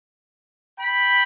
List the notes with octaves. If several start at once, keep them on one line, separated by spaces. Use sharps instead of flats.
G5 B5